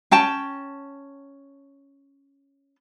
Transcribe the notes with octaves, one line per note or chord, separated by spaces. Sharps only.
C#4 G5 A5